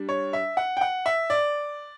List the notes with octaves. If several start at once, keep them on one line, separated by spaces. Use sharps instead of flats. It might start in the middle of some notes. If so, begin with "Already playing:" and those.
Already playing: G3 D4
C#5
E5
F#5
G5
F#5
E5
D5